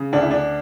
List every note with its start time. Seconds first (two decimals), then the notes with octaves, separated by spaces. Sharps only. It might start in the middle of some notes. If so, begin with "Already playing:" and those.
Already playing: C#3
0.13 D2 D4
0.22 E4
0.31 D4